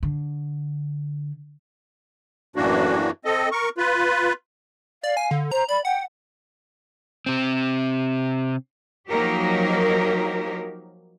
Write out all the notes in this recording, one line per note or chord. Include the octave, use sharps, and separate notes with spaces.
D3
F#2 A2 E3 A#3 D4 F#4
C4 A4 D#5
A#4 C#6
F4 B4
D5 F5
G#5
D3
C5 A#5
D5 B5
F#5 G5
C3 C4
F3 F#3 A#3 D#4 G4 A#4